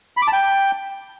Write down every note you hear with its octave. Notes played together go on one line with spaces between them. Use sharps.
B5
D6
A5
G5